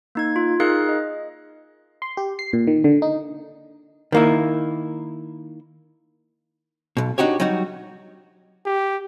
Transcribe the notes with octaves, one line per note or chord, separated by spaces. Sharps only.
A#3 D#4 G#6
F4
D#4 G#4 A#4 F5 F#6 C#7
D#5
C6
G4
C7
A#2
D#3
D3
D#4
D#3 A#3 E4
B1 B2
D4 D#4 F#4 G4 C#5
F#3 G3 D#4 F#4
G4